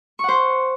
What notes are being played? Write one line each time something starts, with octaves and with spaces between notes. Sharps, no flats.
C5 F#5 C#6